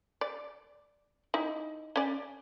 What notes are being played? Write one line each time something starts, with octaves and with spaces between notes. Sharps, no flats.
D5
D#4 E4
C#4 D5